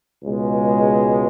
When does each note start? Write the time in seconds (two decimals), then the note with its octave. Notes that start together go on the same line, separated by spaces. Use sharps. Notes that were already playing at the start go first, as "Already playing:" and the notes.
0.24 C#2 B2 G#3